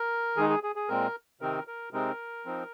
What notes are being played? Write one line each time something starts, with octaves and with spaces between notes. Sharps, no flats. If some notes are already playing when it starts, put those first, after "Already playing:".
Already playing: A#4
D#3 G#3 D#4 G#4
G#4
G#4
G#4
A#2 G#3 C4 A#4
C3 D#3 C4 D#4 A#4
A#4
C3 G#3 C4 D#4 A#4
F3 C4 D#4